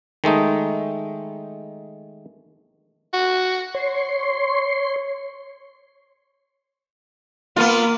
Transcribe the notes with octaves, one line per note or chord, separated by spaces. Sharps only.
D#3 G#3 A3 D#4
F#4
C#5 C6
A#3 B3 F4